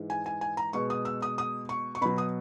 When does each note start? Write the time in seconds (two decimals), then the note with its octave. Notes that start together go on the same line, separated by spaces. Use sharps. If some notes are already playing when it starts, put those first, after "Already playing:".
Already playing: G#2 E3 G#3
0.10 G#5
0.26 G#5
0.41 G#5
0.57 A#5
0.73 B2 G#3 C#6
0.90 D#6
1.05 E6
1.22 D#6
1.38 D#6
1.69 C#6
1.95 C#6
2.01 B2 F#3 B5
2.18 D#6